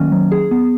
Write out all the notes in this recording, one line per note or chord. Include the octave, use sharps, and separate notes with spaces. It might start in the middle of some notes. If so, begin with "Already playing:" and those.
Already playing: D#3 F#3 A#3 C#4
F#3
G#4
B3